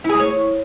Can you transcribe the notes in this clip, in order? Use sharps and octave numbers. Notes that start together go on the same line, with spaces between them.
E4
G#4
G#3
C#5